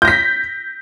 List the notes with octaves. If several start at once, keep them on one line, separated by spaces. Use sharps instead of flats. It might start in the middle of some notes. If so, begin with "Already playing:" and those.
G6 A#6 B6